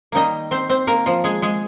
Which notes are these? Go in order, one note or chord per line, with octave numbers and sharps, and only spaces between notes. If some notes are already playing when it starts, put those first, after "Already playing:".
D#3 G3 A#3 D#4 D#5
C4 C5
C4 C5
A#3 A#4
F3 F4
G#3 G#4
G#3 G#4